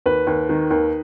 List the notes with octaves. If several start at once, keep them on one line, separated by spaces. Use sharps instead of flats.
D#2 B4
D#2
D#3
D#2